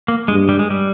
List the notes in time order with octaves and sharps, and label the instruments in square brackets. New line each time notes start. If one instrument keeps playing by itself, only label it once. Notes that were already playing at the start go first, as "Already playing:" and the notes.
[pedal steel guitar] A#3
[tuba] G2 [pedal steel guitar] G#3
[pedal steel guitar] G3
G#3
G3